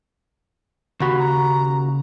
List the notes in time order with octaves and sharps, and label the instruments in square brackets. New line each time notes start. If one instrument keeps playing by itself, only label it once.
[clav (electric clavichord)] D#2 F#4 [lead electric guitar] C#3 B5
[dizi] A#5